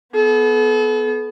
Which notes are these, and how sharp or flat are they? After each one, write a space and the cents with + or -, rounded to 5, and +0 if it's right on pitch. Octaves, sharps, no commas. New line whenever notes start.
B3 +0 A4 -40